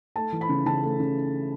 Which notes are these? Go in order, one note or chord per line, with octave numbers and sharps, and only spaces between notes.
A3 A5
E3
B5
C#3
C#3 A5
A3
C#3